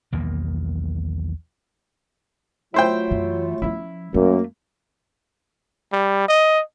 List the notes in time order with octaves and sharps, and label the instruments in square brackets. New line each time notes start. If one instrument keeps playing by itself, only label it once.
[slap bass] B1 E2 D#3 A#3
[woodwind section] F#3 A3 F4 [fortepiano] E4 C5 G5
[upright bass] F#2 E3
[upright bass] F3 C#4 [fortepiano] E4
[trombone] F#2 [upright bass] A3 [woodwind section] A#3
[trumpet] G3
D#5